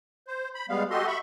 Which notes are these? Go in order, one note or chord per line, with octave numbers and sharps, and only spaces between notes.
C5
B5
G3 G#3 B3 F5
F#4 G4 A4 D#5 C6
E5 B5 C#6